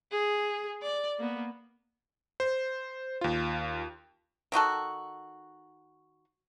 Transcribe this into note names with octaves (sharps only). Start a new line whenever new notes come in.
G#4
D5
A#3 B3
C5
D#2 F4
D#3 D#4 F#4 A4